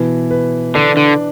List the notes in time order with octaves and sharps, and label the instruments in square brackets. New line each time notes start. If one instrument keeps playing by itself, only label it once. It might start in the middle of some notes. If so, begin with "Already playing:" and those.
Already playing: [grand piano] B2 E3
B4
[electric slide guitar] D3 [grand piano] D4
[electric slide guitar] D3